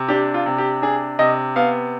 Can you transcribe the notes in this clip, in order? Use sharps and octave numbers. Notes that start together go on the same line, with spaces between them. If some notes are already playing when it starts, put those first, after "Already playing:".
Already playing: C3
D4 G4
F4
C3
G4
D4 G#4
C3 D#5
B3 F5